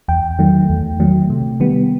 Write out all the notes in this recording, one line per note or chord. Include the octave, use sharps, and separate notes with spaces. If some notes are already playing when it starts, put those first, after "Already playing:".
E2 G5
D#3 F#3 A3
E2
D#3 F#3 A3
C3
D#3 G3 B3